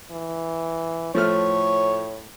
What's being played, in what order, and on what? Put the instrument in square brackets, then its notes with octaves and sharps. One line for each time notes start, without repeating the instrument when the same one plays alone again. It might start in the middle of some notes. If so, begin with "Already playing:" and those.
[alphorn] E3
[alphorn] A2 [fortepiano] F3 A3 F6 [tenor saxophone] C#5